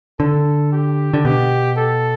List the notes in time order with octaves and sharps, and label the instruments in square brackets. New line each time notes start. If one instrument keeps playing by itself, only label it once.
[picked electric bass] D3 [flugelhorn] A4
[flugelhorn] G4
[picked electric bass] D3
[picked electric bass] B2 [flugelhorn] G4
[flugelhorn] A4